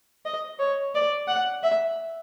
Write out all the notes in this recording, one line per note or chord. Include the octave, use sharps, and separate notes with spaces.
D#5
C#5
D5
F#5
E5